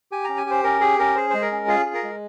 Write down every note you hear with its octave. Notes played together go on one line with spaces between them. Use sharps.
G4 G#5
C#4 A#5
G#5
G4 C5
C#4 A#4
G4 G#4
C#4 A#4
G#4 C5
G#3 C5
A#4
C#4
F4 G#4
G#4
A#4
G#3